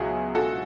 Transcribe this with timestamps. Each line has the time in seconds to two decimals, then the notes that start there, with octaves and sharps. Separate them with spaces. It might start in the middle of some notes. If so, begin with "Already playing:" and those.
Already playing: C#2 B2 F#3 E4 G#4
0.35 F#4 A4